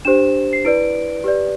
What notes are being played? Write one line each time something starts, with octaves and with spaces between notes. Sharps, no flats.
D4 G4 C5 E7
C7
E4 B4 D5 D7
G4 B4 D5